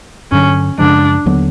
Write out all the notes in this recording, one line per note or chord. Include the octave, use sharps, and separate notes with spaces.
G2 D3 F#3 C#4
F#2 C#3 F3 G#3 D4
D#2 D3 F#3 B3